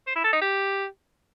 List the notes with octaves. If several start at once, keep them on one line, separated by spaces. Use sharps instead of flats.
C5
E4
A4
D#4
G4